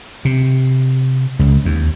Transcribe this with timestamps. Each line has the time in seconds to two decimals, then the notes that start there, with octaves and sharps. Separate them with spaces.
0.25 C3
1.39 C#2
1.65 D#2